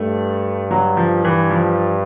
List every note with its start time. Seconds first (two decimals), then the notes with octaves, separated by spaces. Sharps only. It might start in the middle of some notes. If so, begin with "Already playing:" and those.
Already playing: G2 A3
0.71 F#3
0.97 F3
1.25 E3
1.50 F3